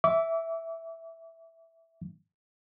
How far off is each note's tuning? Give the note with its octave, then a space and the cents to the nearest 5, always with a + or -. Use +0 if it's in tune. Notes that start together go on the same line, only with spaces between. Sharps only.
E5 +0 D6 -30